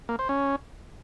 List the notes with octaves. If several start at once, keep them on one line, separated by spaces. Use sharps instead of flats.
A#3
C5
C#4